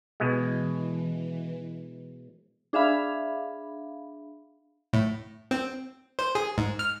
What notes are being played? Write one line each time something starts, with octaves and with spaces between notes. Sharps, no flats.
B2 E3 G#3
D4 G#4 E5 F5 B5
A2
C4
C5
G#4
G#2
F6